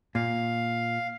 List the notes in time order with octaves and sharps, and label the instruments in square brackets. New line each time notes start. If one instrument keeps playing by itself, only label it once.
[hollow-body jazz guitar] A#2 [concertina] F5